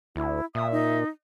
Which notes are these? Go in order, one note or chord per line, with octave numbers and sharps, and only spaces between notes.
D2 E4
A#2 E5 D#6
D#4